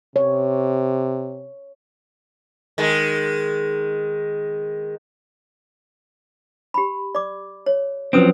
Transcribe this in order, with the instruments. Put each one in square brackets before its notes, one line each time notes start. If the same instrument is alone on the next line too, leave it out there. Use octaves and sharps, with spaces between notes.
[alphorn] C3 [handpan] C#5
[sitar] D#3 G#3
[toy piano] G4 B5
D5 D6
C#5
[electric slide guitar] F3 F#3 C4 [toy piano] C#4 B4 D#6